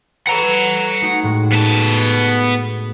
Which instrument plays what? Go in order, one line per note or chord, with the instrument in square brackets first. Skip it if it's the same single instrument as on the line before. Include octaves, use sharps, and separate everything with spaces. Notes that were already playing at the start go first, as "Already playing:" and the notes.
[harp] A4 B4 [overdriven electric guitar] F#5 A#5
[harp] A3 D#4 F#4
A2 G#3
[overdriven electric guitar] B3 A5